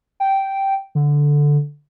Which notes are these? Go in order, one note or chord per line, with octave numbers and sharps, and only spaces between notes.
G5
D3